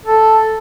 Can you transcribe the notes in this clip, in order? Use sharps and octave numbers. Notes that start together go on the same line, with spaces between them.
A4